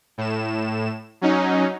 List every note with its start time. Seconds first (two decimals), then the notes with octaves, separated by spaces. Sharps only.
0.18 A2 E7
1.21 F#3 C#4 D#4